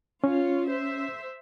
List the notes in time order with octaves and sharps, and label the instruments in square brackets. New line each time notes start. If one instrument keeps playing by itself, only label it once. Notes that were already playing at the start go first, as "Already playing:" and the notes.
[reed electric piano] C#4 [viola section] F4 C#5
[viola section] C5 E5